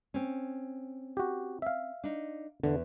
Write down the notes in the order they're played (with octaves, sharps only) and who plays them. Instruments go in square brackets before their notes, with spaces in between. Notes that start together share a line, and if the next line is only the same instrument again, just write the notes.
[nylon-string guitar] C4 C#4
[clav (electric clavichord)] F#4 G4
E5 F5
[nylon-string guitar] D4 D#4
[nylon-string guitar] E2 [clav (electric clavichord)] D3